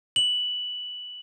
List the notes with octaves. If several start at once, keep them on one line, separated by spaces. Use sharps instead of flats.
F#7